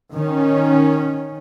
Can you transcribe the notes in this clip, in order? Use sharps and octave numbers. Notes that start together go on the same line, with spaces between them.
D#3 C#4